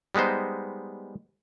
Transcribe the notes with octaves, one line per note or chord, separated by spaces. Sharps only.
G3 G#3 B3 D#4 C5